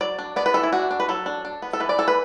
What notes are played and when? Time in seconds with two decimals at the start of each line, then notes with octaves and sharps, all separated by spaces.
0.01 F#3 D5
0.19 D4
0.36 B3 D5
0.46 B4
0.54 E3 A4
0.63 E4
0.73 D4 F#4
0.91 D4
1.00 B4
1.09 F#3 A4
1.26 D4
1.45 D4
1.62 B3
1.73 A4
1.80 E3 B4
1.89 D5
1.98 E3 A4
2.08 B4